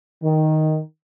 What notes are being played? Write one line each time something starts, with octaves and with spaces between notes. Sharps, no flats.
D#3